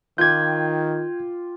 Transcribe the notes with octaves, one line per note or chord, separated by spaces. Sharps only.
D#3 F4 G5 D6 G6 G#6